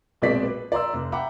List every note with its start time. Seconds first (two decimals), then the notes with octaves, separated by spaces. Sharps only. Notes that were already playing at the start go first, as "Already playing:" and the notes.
0.22 A#1 B2 G#3 C4 D5 B6
0.43 B4
0.72 D5 A#5 C6 E6
0.93 F1
1.12 E5 F#5 G5 A#5 B5 D6